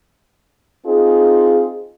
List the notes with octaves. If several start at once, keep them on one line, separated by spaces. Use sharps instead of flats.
C4 D#4 F4 G#4